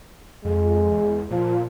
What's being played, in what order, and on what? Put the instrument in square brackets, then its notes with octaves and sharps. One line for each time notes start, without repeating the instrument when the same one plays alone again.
[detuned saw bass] F2 [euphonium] G#3
[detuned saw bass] E2
[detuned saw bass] A#2 [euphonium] F3